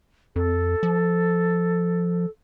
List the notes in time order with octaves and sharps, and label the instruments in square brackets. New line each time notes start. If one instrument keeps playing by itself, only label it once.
[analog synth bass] F2 [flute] A4
[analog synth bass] F3